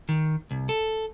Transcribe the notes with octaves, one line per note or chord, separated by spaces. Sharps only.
D#3
C2
A4